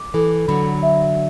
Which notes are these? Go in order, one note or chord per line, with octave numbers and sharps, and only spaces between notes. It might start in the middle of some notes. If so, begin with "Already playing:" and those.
Already playing: D6
E3 A4
D3 F#3 B5
E5